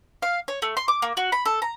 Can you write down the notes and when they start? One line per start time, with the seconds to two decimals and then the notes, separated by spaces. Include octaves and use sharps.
0.22 F5
0.48 C#5
0.62 A3
0.77 C6
0.88 D6
1.02 A#3
1.17 F#4
1.32 B5
1.46 A4
1.62 A#5